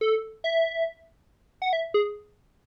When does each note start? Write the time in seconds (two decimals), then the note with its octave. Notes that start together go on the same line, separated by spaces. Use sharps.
0.01 A4
0.44 E5
1.62 F#5
1.73 E5
1.94 G#4